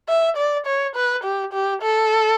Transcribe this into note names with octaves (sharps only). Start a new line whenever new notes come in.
E5
D5
C#5
B4
G4
G4
A4